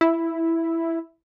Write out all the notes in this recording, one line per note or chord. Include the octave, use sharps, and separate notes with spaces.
E4